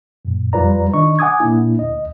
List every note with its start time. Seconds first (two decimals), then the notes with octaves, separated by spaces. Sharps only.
0.25 F#2 A#2
0.53 F2 G3 F4 B4 D5 A#5
0.94 D#3 D4 D#5 C#6
1.19 F#5 G#5 D6 D#6 G#6
1.40 A#2 A#3 D4 E4
1.79 D2 D#5